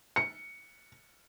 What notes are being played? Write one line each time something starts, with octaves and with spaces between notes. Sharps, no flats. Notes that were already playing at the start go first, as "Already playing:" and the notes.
C#7